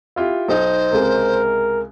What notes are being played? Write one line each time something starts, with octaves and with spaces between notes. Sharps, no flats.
E4 F4 G4
B1 D#4 C5
C#2 C3 G#3 A#4